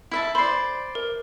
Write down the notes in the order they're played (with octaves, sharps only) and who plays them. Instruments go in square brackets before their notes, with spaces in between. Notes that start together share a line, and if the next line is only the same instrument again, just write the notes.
[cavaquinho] E4 E5 A5
[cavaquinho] C5 D5 [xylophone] B5 C7
[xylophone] A#4